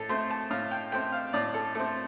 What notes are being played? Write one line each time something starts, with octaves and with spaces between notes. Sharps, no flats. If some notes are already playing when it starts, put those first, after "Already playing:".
Already playing: A2 A4
A3 C4 C6
A5
A2 F5
G5
A3 C4 G5
F5
A2 D5
A4
A3 C4 A4